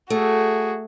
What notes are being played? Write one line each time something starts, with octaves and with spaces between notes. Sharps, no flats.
A3 F#4 G#4